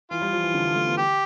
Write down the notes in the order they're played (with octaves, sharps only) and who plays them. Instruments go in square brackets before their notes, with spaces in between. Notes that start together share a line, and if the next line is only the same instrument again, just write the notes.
[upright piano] E3 [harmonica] F4
[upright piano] G3
F3
E3
D3
D3
A3
B3
[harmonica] G4